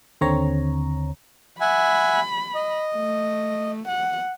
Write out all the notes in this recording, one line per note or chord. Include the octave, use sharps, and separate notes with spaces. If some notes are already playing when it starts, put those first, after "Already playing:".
D#2 D3 C4 C#5 A#5
E5 F#5 G#5 B5
D#5
A3
F#5